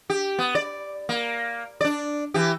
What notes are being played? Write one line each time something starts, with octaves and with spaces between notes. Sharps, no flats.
G4
B3
D5
A#3
D4 D5
E3 G4